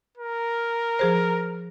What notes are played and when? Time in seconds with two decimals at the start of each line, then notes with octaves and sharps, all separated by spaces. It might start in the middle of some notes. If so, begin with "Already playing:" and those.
0.17 A#4
0.99 F3 G#4 C5